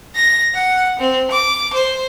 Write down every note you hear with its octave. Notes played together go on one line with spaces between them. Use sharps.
A#6
F#5
C4
D6
C5